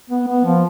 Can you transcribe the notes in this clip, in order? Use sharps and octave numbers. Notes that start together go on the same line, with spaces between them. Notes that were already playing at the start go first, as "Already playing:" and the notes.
B3
B3
F3